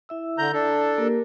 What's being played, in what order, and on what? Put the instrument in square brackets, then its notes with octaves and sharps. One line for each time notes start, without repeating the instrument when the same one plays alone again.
[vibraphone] E4 E5 E6
[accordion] D3 A#5 G6
D4 A4
[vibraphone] A#3 G4 A#4